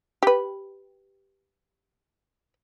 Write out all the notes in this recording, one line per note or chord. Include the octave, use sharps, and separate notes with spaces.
G4 B4